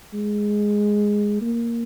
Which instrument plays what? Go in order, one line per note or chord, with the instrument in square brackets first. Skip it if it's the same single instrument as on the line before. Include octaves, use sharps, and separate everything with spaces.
[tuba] G#3
A#3